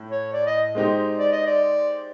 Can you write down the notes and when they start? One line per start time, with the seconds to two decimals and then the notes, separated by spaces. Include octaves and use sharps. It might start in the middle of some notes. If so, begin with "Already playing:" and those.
Already playing: A2
0.11 C#5
0.33 D5
0.47 D#5
0.75 G#3 C4 D#4 G4
1.18 D5
1.32 D#5
1.46 D5